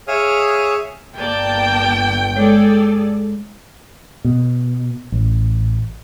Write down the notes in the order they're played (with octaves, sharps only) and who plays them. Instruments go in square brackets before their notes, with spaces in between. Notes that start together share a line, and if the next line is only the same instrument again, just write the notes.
[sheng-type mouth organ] G#4 C#5 E5 F5 D#6 F6
[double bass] G1 [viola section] A#3 D5 A5 [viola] G5
[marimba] G#3 C#5 [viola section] G#4 A4 D5
[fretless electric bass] B2
A1